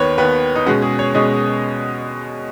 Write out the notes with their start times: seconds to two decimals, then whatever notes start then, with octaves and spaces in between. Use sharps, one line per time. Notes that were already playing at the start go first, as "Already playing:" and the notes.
Already playing: D#2 D#3 B3 B4 C#5
0.18 D#2 D#3 B3 B4
0.55 D#4
0.66 B2 G#3 C#4 F#4
0.82 G#4
0.99 C#5
1.15 B2 G#3 C#4 D#5